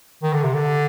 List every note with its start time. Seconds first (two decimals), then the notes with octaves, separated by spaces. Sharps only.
0.23 D#3
0.33 D3
0.44 C3
0.54 D3